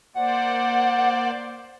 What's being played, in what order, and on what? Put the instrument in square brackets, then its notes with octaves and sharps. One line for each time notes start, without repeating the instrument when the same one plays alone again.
[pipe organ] A#3 C5 D5 [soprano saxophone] F#5